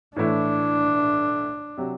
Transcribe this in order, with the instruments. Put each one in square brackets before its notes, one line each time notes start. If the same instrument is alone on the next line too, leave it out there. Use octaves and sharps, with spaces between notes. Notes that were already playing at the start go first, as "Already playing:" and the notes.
[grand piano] A2 E3 A3 E4 [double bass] D4
[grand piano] C3 F#3